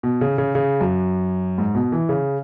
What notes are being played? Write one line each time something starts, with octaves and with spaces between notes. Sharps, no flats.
B2
C#3
C#3
C#3
F#2
G#2
B2
E3
C#3